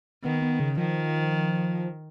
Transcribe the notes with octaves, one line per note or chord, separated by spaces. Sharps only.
D#3 B3
B3
C#3
D#3 F3